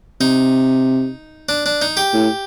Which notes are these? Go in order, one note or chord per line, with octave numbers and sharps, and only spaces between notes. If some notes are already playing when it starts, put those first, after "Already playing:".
C3 D#4
D4
D4
D#4
G4
A2